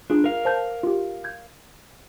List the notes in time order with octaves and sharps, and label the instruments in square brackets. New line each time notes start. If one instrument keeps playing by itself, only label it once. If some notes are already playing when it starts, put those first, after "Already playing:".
[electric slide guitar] D4 [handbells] F4 G#4
[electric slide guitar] A#4 F5
[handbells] C5 A5 G6
F4 G4
G6 G#6